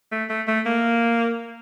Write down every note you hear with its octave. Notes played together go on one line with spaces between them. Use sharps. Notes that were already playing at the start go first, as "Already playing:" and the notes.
A3
A3
A3
A#3